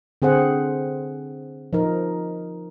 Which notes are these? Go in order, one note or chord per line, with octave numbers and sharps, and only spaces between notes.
D3 C4 G#4 C5 F#5
F3 D#4 A#4